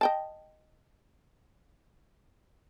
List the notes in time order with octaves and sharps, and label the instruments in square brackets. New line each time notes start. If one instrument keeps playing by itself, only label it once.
[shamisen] D#5 G5 A5